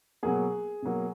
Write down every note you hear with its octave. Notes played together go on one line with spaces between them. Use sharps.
B2 F#3 A#3 G#4
B2 F#3 A#3